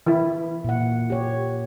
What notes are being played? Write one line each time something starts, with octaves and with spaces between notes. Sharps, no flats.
E3 E4
A#2 F#5
G4 C#5